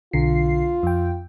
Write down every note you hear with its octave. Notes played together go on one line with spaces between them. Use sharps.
B1 D3 F4 C7
F2 G5